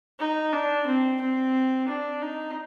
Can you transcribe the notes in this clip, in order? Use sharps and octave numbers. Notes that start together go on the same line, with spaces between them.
D#4
D4
C4
C4
D4
D#4